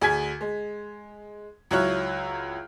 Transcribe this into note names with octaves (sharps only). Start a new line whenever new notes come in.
D2 G#4 G#5 G#6 B6
G#3
C#2 F#3 E4 C#5 F6 F#6